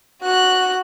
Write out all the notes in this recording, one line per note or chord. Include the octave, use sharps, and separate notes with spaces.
F#4 F#6